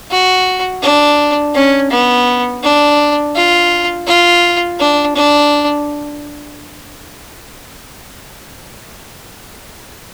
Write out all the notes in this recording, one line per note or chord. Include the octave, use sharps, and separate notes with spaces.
F#4
D4
C#4
B3
D4
F4
F4
D4
D4